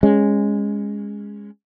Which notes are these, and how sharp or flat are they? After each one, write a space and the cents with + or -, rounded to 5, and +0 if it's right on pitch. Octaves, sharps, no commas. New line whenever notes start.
G#3 -10 C#4 +0